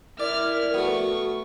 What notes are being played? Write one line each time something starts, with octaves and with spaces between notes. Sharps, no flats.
E4 A#4 D5 F6
A3 B3 F#4 C#6